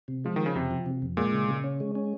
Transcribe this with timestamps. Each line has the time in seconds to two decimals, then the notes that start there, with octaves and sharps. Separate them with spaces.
0.08 C3
0.24 F3 G#3
0.36 D#3 F3
0.46 C#3
0.55 F2 C3
0.71 F3
0.86 C3
1.02 F2
1.17 A#2 G#3
1.33 C#3
1.48 C#3
1.64 C#4
1.80 G#3
1.95 C#4